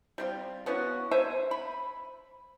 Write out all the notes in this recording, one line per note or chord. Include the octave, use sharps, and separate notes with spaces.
G3 C4 F4
B3 C#4 E4 F#4
C5 E5 G#5
B5